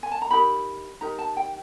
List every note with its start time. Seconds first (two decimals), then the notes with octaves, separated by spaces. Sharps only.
0.03 G#5
0.11 A5
0.22 A#5
0.31 D#4 G4 A#4 B5
1.01 D#4 G4 A#4 A#5
1.19 A5
1.37 G5